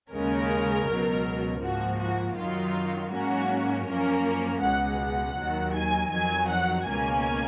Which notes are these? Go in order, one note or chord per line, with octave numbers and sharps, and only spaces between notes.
D#2 C#3 G#3 C#4 A#4
C#2 B2 F#3
G#2 F3 A#3 F#4
F#4
F#2 D#3 F#3 F4
G#2 F#3 A#3 C#4 F#4
F#2 F3 A#3 C#4 A#4
C#2 B2 G#3 F#5
F#5
D#2 D#3 F#3
G#5
F2 D#3 F#3 G#5
F#5
C#2 B2 A#3 C#4 G#5